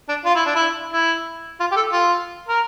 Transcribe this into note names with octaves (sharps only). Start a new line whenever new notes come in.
D4
F4
E4
D4
E4
E4
F4
G4
A4
F4
A#4